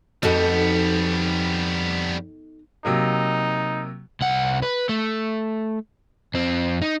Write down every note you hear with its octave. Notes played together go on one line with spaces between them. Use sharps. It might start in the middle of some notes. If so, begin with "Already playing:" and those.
F2 G3 B3 D#4 F#4 A4
C3 F#3 A#3 D#4
C2 F#5
B4
A3
F2 C4
D#4